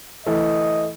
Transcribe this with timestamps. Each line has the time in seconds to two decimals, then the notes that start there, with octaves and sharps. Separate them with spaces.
0.26 E3 A3 D#5